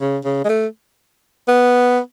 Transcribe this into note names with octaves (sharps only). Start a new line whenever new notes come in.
C#3
C#3
G#3
A3
B3